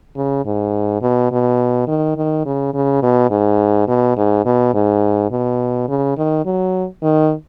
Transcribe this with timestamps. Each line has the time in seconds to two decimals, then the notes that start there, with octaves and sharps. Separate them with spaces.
0.16 C#3
0.46 G#2
1.02 B2
1.31 B2
1.87 D#3
2.16 D#3
2.45 C#3
2.74 C#3
3.03 B2
3.31 G#2
3.88 B2
4.17 G#2
4.45 B2
4.74 G#2
5.31 B2
5.88 C#3
6.17 D#3
6.45 F#3
7.02 D#3